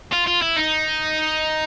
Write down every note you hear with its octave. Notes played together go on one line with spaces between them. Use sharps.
F4
F4
E4
D#4